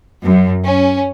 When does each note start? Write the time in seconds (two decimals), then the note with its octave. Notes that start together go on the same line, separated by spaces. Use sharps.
0.23 F#2
0.64 C#4